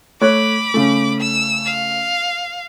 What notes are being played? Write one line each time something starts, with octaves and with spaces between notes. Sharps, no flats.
A3 C#5 B5 D6 F#6
C#3 A3
E6
F5